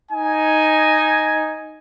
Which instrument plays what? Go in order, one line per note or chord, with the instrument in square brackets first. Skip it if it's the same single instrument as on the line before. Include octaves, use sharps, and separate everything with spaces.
[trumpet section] D#4 G#5